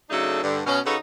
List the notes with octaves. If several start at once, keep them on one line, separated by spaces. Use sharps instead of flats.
C#3 F#3 A3 D4 D#4 A4
G2 D3
B2 C#4
C#3 D#4 F#4 A4 B4 C#5